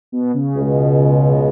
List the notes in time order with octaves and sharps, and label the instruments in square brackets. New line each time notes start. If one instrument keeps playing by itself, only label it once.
[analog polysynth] B2
C#3
[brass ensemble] C#2 B2 G#3